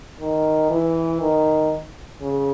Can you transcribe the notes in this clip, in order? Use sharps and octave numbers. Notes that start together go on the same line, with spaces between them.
D#3
E3
D#3
C#3